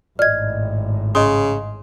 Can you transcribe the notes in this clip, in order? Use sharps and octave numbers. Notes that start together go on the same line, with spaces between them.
G#1 A2 D5 D#5 F6 G#6
C#3 D#5 C6 D#6